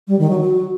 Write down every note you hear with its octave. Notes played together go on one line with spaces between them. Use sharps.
G3
D#3
F#3
F#4